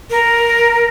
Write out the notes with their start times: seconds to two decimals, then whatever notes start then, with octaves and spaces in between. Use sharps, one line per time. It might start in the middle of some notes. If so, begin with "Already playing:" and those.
0.10 A#4